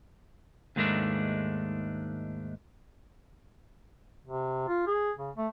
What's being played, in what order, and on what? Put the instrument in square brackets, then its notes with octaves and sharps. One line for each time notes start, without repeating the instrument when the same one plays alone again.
[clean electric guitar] D#2 G#2 D#3 G#3 A3 D4
[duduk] C3
F4
G#4
C#3
A3